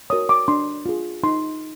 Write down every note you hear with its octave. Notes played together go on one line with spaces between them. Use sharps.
F#4 A#4 C#5 D#6
D6
D4 C6
F4 G#4
D#4 C6